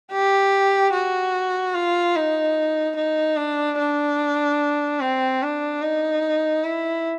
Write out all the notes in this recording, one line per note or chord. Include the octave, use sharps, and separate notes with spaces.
G4
F#4
F4
D#4
D#4
D4
D4
C4
D4
D#4
E4